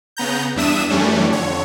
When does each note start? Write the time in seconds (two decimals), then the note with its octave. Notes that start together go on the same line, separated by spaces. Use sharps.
0.17 C#3 B3 A#5 G6
0.55 E2 G2 D4 E5 D#6 E7
0.89 F#2 E3 G3 A3 C#4 D4
1.30 F2 D3 C#5